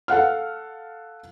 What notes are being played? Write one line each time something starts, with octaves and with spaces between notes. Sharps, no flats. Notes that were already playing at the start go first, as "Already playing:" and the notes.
A4 F5 F#5 F6